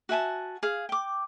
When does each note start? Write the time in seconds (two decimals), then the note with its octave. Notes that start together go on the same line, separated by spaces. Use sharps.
0.09 F#4 E5 G#5 A5
0.63 G#4 F5
0.89 G5 D6